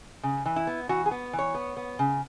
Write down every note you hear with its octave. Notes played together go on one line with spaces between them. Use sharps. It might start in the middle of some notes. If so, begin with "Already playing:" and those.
C#3
E3
E4
B3
E3 F#4
G#4
B3
E3
C#5
B3
B3
C#3